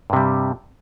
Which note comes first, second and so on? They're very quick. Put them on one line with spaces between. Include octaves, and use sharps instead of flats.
G2 C3 G3